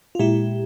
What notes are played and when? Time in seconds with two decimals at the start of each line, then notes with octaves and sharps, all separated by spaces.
0.15 F4
0.19 A#2 G#3 E4 G4